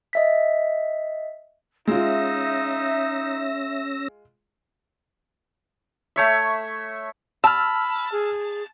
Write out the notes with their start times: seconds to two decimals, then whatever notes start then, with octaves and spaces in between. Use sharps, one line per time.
0.13 D#5 E5 B6
1.87 G#3 C#4 D#4 F4 E5 E6 A#6
6.16 A3 C#5 E5
7.44 A5 B5 E6 F6
8.12 G#4